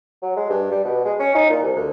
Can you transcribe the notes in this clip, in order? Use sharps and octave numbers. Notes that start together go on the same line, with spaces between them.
F#3
G#3
G2
G3
B2
G#3
C#4
D#4
A#2
C2
D2